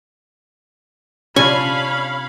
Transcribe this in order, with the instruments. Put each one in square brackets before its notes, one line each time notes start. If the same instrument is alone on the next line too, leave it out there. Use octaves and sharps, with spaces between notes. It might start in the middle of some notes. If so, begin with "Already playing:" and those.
[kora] C3 D4 F4 [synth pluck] C#4 [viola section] C#5 F5 B5 [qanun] G#5